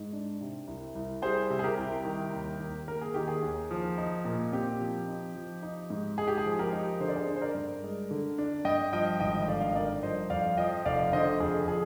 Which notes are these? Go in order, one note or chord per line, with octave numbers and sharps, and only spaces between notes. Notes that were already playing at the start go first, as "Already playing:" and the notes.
Already playing: G#2
D4
C3
C2
C2
G3 G#4 C5
C3
G#4
G4 A#4
C2
D#3
D#2
D#2
A#3 A#4
G#4
D#3 G4
G#4
D#2
F3
D#4
A#2
C4 G4
F3
D#4
F3
D#4
G#2
G#3 G#4
G4
G#4
F3
G4 A#4
D#4
D3 C5
D5
G#4 C5
D4
C5
A#4 D5
G2
G#3
D3
D4
G2 D#5 G5
F3 D#5 G5
G#1 D#5 G5
D#5
D3 D5 F5
F5
D#5
G2 A#4 D5
F3 C5 D#5
F2 D5 F5
F3 D#5 G5
F1 D5 F5
D3 C5 D#5
F2 G#4
F3 G#4